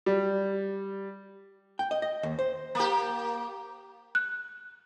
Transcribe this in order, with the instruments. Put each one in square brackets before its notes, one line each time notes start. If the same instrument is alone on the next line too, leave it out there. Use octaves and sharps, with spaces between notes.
[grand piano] G3
[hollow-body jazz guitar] G5
D#5
D#5
D#2
C5
[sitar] A#3 G4
[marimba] F#6